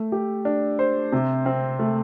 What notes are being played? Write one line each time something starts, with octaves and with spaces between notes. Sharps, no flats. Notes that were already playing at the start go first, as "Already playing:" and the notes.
Already playing: A3
G4
D4
C5
C3
C4
A3